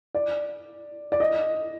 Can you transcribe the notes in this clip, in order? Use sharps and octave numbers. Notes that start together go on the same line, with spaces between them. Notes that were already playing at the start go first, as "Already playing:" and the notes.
D5
D5
D#5